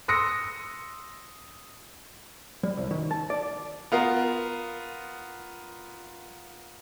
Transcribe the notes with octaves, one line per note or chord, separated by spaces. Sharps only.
C6 D#6 E6 A#6 C#7
G3
C2
D#3
A5
D5
B3 F4 A#4